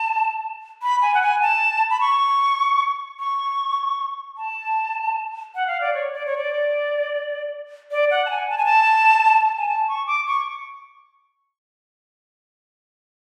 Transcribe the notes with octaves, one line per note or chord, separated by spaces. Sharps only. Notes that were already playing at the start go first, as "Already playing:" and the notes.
Already playing: A5
B5
G#5
F#5
G#5
A5
B5
C#6
C#6
A5
F#5
F5
D5
C#5
D5
C#5
D5
D5
F#5
A5
G#5
A5
G#5
A5
G#5
A5
C#6
D6
C#6